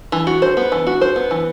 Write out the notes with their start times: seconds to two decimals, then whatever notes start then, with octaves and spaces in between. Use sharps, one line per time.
0.12 E3
0.27 F#4
0.42 C5
0.57 B3
0.72 E3
0.87 F#4
1.01 C5
1.16 B3
1.31 E3